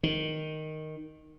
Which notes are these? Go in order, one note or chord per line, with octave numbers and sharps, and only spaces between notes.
D#3